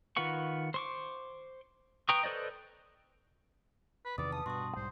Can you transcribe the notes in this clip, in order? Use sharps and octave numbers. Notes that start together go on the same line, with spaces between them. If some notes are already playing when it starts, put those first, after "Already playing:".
D#3 F4 B4 F#5 C#6
C5 C#6 D6
B4 G5 A#5 C#6 D#6
A4 B4 C5 D5 D#5
B4
E2 C3 D#3 B4 D5 D#6
A5 D#6
G2 B2 F#4 C6 D#6
B1 G#2 G3 C5